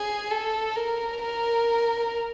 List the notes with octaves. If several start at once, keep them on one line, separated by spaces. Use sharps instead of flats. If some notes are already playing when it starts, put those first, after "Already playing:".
Already playing: G#4
A4
A#4
A#4